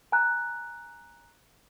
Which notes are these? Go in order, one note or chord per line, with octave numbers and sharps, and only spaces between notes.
G#5 A#5 F#6